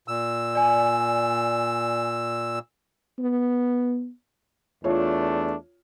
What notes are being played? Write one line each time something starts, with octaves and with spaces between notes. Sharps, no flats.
A#2 E6
D5 G#5
B3
E2 A3 D4 F4 C#5